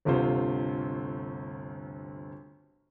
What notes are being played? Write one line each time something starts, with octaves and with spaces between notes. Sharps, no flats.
G1 D2 C3 F4 C5